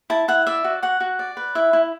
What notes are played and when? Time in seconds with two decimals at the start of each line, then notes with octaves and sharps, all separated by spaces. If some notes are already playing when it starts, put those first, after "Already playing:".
0.10 E4 A5
0.28 E4 F#5
0.47 D5 E5
0.64 F#4
0.82 F#4 F#5
1.00 F#4
1.19 D5
1.37 B4
1.55 E4 E5
1.73 E4